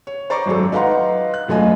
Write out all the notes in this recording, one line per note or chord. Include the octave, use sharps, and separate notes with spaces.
C#5
C5 D5 A#5 C#6 D6
G#1 F#2 F#3 A4
D#4 B4 F5 F#5 A#5 C6
F#6
E1 F#2 A3 F4 D#5 G#5